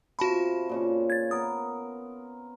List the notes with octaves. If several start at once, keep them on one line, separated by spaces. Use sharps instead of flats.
C3 F4 F#4 A5 B5 C#6
A#2 C#3 C#6
G#6 A6
B3 A#4 D#6